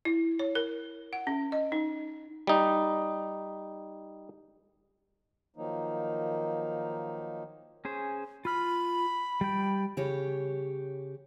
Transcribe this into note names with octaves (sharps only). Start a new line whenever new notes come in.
E4
C#5
A#4
F#5
C#4
D#5
D#4
G3 D#4
D#3 F3 F#3 A#3 D#4
C#4 G#4 C5
F4 B5 F6
G3 G5
C#3 G4 C#5